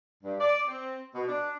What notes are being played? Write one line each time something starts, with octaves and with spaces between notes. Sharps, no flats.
G2
D5
C4
B2
D4